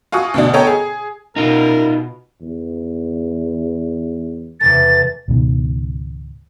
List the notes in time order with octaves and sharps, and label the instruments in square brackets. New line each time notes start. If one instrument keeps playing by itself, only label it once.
[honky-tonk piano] F4 F#4 G#5 C#6 D#6
D2 B2 D4
B3 A4 C#5 D#5 G5 A#5
G#4
[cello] B2 [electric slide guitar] D#4 F4 [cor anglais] A#4
[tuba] E2
[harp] E2 C3 A3 [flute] A6
[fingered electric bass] C#2 G#2 B2 D#3